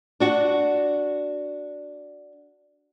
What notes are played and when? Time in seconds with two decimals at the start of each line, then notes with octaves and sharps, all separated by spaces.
0.20 D4 F#4